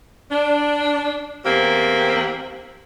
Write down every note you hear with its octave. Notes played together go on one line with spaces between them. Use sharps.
D4
E2 A#3 C4 G4